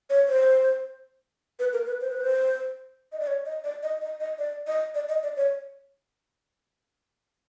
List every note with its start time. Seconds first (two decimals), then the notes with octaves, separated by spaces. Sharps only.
0.10 C#5
0.28 C5
1.59 B4
1.73 A#4
1.86 B4
2.01 C5
2.11 B4
2.21 C5
3.12 D#5
3.20 D5
3.27 C#5
3.45 D#5
3.64 D5
3.83 D#5
4.01 D#5
4.20 D#5
4.39 D5
4.67 D#5
4.95 D5
5.09 D#5
5.23 D5
5.36 C#5